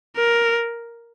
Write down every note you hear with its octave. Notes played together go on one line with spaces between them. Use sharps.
A#4